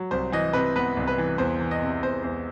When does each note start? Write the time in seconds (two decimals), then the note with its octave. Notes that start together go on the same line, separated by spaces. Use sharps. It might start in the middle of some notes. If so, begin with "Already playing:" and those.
Already playing: F#3
0.11 C2 C5
0.32 E3 D#5
0.53 C3 B4
0.76 B3 B4
0.97 C2
1.07 B4
1.18 E3
1.38 E2 C5
1.59 E3
1.71 D#5
1.82 C3
2.03 E2 C5
2.23 E2 C5